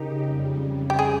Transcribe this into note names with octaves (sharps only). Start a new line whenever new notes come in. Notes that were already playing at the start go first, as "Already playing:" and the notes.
Already playing: C#3 D#4 G4 A#4
F2 C#3 G3
G4
G#4